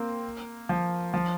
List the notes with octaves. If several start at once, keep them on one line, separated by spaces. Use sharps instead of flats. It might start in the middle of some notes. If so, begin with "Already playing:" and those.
Already playing: A#3 C4
F3
F3